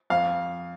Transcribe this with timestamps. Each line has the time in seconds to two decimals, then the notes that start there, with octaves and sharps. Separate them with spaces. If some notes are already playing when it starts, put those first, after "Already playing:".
0.10 F2 F5